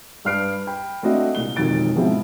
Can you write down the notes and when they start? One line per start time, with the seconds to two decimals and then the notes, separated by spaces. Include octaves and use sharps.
0.25 G2 B4 F6 C7 D7
0.67 G5 B5
1.03 A3 C4 D4 F#4 D#5 E5
1.35 C2 A#2 G3 G7
1.56 E1 F2 D#3 A6 D7
1.95 G#2 B2 F3 G#3 C4 E4